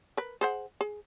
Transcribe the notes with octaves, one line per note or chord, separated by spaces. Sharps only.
A#4 B4
G#4 C5 F#5
G#4